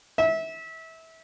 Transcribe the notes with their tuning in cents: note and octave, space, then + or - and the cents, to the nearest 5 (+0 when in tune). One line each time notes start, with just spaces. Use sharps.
E5 -25